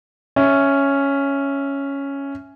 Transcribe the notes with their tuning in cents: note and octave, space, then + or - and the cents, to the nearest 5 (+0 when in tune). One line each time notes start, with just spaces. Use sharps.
C#4 +0 E5 +0